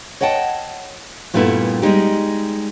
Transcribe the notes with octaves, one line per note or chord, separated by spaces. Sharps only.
C#5 D#5 F#5 G5 A5
G2 A#2 G3 A3 B3 E4
G3 G#3 D#4 G4